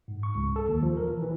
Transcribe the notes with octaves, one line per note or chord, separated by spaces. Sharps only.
G#2
C#6
C#2
A4
D#2
F3
A#4
E3
E3